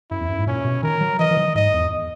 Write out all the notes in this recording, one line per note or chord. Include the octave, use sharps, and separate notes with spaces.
F#2 E4
E2
F#2
G#2
A#2 C#4
B2
D#3 A#4
F#3
E3 D#5
E3
D#3
G#2 D#5
E2